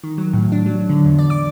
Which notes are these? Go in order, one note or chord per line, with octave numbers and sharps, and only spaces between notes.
D#3
F#3
A2
D4
F#3
D3
E2
D5
D6